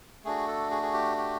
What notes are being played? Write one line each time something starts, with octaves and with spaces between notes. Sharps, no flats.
A3 D4 F#4 G#4
A4
G#4
G#4
G4
G4